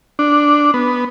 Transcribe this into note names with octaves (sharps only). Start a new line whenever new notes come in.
D4
B3